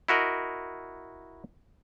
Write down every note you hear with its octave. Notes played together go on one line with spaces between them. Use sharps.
E4 F#4 A#4 D#5